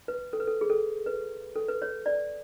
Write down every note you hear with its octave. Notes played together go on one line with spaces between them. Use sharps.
B4
A4
B4
A4
G#4
A4
B4
A4
B4
C#5
D5